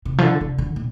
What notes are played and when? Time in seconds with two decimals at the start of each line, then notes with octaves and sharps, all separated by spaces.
0.05 C3
0.18 F3
0.23 D3
0.41 C3
0.58 D3
0.76 A#2